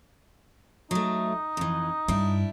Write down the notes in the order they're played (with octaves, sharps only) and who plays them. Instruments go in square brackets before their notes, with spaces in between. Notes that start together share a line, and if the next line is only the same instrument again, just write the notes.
[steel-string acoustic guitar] F#3 A3 [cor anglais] D#4
[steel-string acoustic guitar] F2 E3
[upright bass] G2 [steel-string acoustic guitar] G3 D4 E4